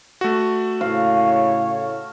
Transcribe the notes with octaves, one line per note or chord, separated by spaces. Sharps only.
A3 F#4
A2 C#3 C#5 F5